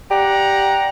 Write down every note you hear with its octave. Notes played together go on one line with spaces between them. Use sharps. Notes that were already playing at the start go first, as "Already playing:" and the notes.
G4 D5 F#5 A#5